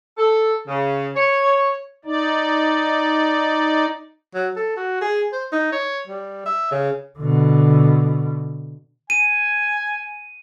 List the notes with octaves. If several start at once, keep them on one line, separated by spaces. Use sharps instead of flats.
A4
C#3
C#5
D#4 D5
F#3
A4
F#4
G#4
C5
D#4
C#5
G3
E5
C#3
B2 D3
G#5 D#7